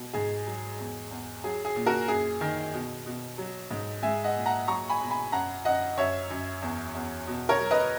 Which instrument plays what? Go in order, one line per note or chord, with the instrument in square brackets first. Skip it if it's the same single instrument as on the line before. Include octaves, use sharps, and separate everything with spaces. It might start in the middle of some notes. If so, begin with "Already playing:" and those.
Already playing: [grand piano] B2
G#2 G#4
F#3
E2
E2
F#3 G#4
G#4
A#2
F#4 A#4
F#2 G#4
D#3
B2
B2
F#3
G#2
G#3 E5 G#5
D#5 F#5
A#2
F#5 A#5
F#3 A#5 C#6
G#5 B5
B2
G#5 B5
F#2 F#5 A#5
F#2 D#5 F#5
F#2 C#5 E5
F#2
E2
E2
B2
A#4 C#5
F#3
B4 D#5